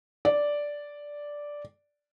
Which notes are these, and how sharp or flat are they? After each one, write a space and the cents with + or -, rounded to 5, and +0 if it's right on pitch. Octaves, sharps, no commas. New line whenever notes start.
D5 -5